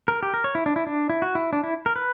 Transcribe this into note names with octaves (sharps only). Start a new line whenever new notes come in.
A#4
G4
A#4
C#5
E4
D4
E4
D4
E4
F#4
E4
D4
E4
A#4
B4